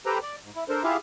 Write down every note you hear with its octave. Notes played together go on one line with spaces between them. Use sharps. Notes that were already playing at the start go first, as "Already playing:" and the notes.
G4 A4 B4 C5 G5 A#5
D5
G#2
E4
D4 A4 A#4 C5
E4 F4 G4 G#4 E5 F5